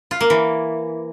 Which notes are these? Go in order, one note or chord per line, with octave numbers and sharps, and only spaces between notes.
F4
A#3
E3